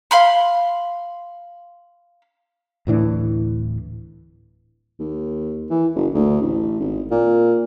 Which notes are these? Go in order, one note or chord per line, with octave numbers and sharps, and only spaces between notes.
F5 B5 C6
D1 A2 E3 D4
D#2
E3
F#1
D2
A1
G#1
A#2